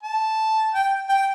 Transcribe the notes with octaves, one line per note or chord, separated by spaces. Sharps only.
A5
G5
G5